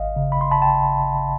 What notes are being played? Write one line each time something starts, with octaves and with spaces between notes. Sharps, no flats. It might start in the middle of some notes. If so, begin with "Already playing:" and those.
Already playing: G#1 D#5 F5
C#3
B5
C6
A5 B5
G5 A5